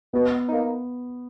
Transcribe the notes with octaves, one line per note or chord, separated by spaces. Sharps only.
B2 B3
A#3 D#4